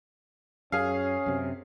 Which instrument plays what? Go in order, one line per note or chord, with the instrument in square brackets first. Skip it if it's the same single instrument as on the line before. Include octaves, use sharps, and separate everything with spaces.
[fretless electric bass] F#2 [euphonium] C#4 [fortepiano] G#4 F5
[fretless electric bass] F#2 C3